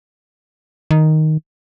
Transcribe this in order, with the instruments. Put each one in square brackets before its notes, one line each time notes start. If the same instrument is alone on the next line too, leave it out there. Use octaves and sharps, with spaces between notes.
[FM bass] D#3